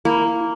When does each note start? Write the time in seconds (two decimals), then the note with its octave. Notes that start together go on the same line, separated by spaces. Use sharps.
0.05 A#3 E4